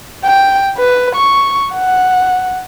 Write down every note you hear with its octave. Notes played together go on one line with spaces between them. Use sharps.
G5
B4
C#6
F#5